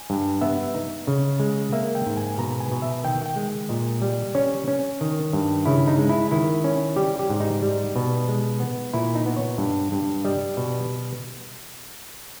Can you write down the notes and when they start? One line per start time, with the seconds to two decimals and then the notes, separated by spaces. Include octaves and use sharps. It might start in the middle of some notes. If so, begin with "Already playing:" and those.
Already playing: G#5
0.10 G2
0.41 B3 E5
0.74 D#4
1.07 C#3
1.40 G#3
1.73 A#3 E5
1.95 G5
2.06 G#2
2.17 G#5
2.38 B2 A#5
2.60 G#5
2.72 B2
2.82 E5
3.04 D#3 G5
3.26 G5
3.36 G#3
3.69 A#2 D#5
4.02 G3
4.35 C#4 C#5
4.68 C#4
5.01 D#3
5.33 G2
5.66 C#3 E4
5.87 D#4
5.98 G#3
6.09 E4
6.31 D#3 E4
6.64 C#4
6.96 G3 G4
7.19 G4
7.30 G#2
7.40 D#4
7.62 G3
7.96 B2
8.28 G#3
8.60 B3
8.93 A#2 E4
9.15 D#4
9.26 B3
9.36 C#5
9.58 G2
9.92 G2
10.25 G3 D#5
10.57 B2